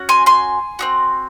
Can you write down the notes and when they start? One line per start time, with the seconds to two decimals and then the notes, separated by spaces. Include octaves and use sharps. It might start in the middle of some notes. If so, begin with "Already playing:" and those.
Already playing: C#4 F#4
0.09 G#5 C6
0.26 G#5 C6
0.79 C4 D#4 F#4